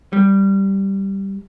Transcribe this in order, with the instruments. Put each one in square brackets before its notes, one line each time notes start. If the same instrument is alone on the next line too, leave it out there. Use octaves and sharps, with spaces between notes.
[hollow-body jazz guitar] G3